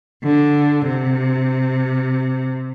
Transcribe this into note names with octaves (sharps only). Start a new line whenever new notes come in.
D3
C3